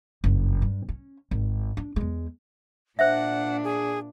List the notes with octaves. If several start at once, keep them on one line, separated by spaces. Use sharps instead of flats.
F#1 G2
G2
C#4
G#1
D4
E2 G#3
A#2 D4 C5 E5 F#5
G#4